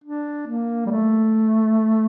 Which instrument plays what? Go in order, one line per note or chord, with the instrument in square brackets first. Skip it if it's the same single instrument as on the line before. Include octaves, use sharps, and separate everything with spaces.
[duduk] D4
A#3
G3
A3